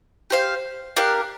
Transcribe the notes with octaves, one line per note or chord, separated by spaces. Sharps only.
G4 C5 F5
D4 G4 A#4 F5